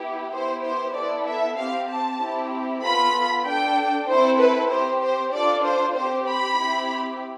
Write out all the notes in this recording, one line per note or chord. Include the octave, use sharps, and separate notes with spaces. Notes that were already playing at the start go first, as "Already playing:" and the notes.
Already playing: B3 E4 G4
B3 E4 G4 C5
C5
B3 E4 A4 D5
E5
C4 G4 F5
A5
C4 E4 G4
B3 F4 A4 B5
D4 A4 G5
C4 E4 A4 C5
B4
C4 G4 C5
C5
D4 F4 A4 D5
C5
C4 G4 C5
B5
C4 E4 G4